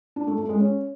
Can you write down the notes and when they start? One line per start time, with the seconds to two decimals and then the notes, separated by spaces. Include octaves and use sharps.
0.16 D4
0.27 A3
0.38 A3
0.49 G#3
0.60 C#4